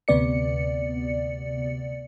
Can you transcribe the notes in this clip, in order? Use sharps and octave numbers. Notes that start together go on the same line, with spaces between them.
D2 C3 B3 D5 C#7